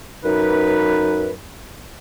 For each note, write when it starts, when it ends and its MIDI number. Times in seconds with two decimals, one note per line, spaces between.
0.24 1.31 42
0.24 1.31 63
0.24 1.31 71